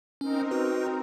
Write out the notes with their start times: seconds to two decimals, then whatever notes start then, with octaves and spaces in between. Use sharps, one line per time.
0.21 C4 C#4 D#4 A#4
0.51 F#4 B4